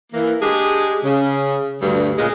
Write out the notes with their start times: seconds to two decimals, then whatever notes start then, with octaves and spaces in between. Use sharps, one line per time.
0.13 E3 A#3
0.41 G#3 D4 G4 G#4
1.05 C#3
1.82 D2 G2
2.17 A#2 C#3 G#3